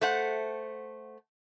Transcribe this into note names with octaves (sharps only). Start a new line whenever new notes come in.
A3 C5 F#5